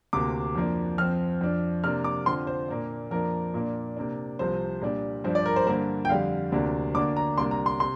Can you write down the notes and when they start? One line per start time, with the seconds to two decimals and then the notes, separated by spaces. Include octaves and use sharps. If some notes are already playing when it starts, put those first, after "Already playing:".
0.13 D2 C3 A#3 D6
0.55 F2 F3 A#3 D4
0.98 F2 F3 C4 F6
1.41 F2 F3 D4
1.83 C3 A#3 D4 F6
2.04 D6
2.26 F2 D3 F3 C4 C6
2.47 C5
2.68 A#2 A#3 D4
3.11 F2 F3 A#3 D4 A#4
3.54 A#2 A#3 D4
3.96 C3 A#3 D4
4.39 C2 C3 F3 C5
4.81 A#2 G3 D4
5.24 G2 F3 D4 C5
5.35 D5
5.46 A#4
5.56 C5
5.67 G2 D3 A#3 C5
6.05 G5
6.09 F2 D3 G3 F5
6.52 D2 C3 A#3 D4
6.95 D2 D3 A#3 D4 D6
7.17 A#5
7.38 C2 C3 A#3 D4 C6
7.51 A#5
7.66 C6
7.80 C3 C6